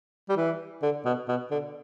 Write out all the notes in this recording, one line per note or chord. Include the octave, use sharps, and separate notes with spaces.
G3
E3
D3
B2
B2
D3